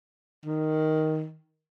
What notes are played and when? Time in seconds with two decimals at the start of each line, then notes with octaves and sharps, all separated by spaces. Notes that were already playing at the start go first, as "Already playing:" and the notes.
0.46 D#3